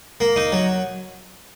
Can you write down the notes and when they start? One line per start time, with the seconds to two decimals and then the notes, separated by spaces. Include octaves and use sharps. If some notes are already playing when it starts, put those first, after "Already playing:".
0.20 A#3
0.36 D#4
0.52 F#3